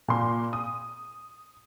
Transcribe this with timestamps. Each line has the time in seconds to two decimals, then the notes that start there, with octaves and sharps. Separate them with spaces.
0.08 A#2 C6
0.53 D#6